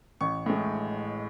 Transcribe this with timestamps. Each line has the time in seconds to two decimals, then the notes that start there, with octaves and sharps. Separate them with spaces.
0.21 A1 C#6
0.46 A2 G#3